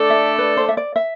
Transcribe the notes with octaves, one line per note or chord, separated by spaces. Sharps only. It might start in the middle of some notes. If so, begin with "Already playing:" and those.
Already playing: A3 D4 A4 D5
E5
B4
C5
E5
D5
E5